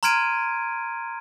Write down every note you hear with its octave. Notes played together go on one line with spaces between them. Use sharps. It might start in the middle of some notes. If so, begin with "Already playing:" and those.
A#5 C6 F6 G#6 D7 D#7